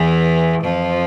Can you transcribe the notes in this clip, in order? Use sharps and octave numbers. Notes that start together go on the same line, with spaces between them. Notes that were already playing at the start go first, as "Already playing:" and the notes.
Already playing: E2 E3
F2 F3